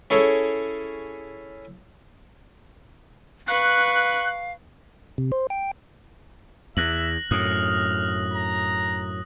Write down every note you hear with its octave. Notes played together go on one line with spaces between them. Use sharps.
C#4 E4 G#4 A4 C#5
B4 F5 C#6 F#6
C3
C5
G5
E2 E5 F#6 A#6 F#7
F#2 A2 D#6 F6 F#6
A#5